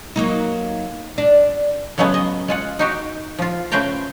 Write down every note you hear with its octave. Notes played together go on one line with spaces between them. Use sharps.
F#3 A#3 D#4
D4
C#3 F#3 G#3 A3 B3
D#5
G#3 F4 F#5
D#4 F#4 G4
F3 F4
C#3 A3 B4 C5 G5 A#5